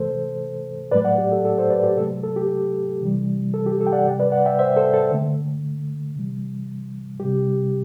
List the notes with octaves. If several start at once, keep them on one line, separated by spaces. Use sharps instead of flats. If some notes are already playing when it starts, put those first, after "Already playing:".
Already playing: C3 E3 A3 A4 C5
A2 F#3 A3 B4 D5
D5 F#5
G4
A4
A4
A4 C5
B4 D5
G4
C3 F#3 A3 A4
A4
G4
C3 E3 G3
A4
G4
A4
G5
D5 F#5
C3 G3
B4 D5
D5 F#5
E5 G5
C5 E5
A4 C5
A4
D3 A3
C3 E3 G3
C3 G3 G4